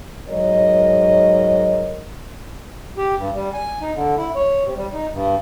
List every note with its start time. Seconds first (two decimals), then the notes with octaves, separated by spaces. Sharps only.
0.28 G#2 F#3 A#4 C#5 D#5
2.97 G4
3.17 G2
3.34 G3
3.53 G#5
3.82 D#4
3.95 D3
4.17 E4
4.35 C#5
4.65 C3
4.77 G3
4.93 D#4
5.12 G2